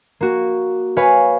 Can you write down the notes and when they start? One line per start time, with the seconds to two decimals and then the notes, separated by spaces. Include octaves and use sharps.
0.21 A#3 F#4
0.97 B4 C#5 F5 G#5